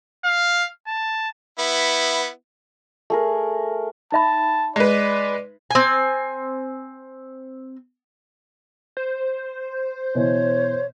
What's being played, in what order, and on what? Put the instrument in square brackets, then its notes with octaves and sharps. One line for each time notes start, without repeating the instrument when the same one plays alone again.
[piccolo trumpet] F5
A5
[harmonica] B3 E4
[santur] A3 G#4 A#4
[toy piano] D#4 E5 B5 [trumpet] A5
[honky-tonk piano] G#3 B4 [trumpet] D5
[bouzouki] C4 G#5
[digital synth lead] C5
[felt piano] B2 E3 [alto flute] C#5